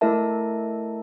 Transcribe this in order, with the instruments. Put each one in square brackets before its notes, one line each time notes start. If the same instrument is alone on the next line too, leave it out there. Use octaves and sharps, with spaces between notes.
[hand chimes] A3 E4 A#4 E5 A5